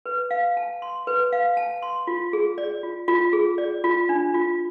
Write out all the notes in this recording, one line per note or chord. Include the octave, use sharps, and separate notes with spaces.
B4
F5
A5
C6
B4
F5
A5
C6
F4
G#4
D5
F4
F4
G#4
D5
F4
D4
F4